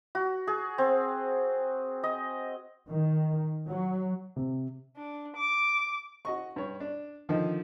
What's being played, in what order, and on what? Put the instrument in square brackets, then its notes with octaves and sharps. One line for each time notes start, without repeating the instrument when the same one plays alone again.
[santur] F#4
G#4
C4
D#5
[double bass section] D#3
F#3
[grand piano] C3
[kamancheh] D4
D6
[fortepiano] F#4 D#5 C#6
G2 C#5
D4
D3 D#3 F3 D#4